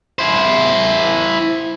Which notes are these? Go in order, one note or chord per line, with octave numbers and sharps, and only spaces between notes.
E4 C5